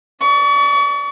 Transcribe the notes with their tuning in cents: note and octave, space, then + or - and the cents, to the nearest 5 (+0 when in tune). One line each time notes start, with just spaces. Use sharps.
D5 +0 C#6 +40